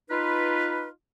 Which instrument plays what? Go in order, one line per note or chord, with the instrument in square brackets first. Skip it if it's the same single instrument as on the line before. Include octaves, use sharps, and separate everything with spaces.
[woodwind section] D#4 F4 B4